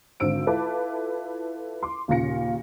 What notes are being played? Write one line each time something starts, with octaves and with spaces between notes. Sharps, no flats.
G#1 D3 C4 E6 D7
E4 F4 A4 B4 A5 D6
C6 D6
D#2 A#2 C#3 F4 A#6 C#7